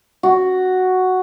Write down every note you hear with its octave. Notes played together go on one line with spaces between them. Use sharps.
F#4